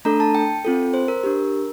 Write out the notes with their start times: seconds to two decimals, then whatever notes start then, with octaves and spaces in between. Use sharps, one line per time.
0.05 A3 D4 A4 A#5
0.20 A5
0.35 G5
0.65 C4 F4 A4
0.94 C5
1.08 A#4
1.24 D4 G4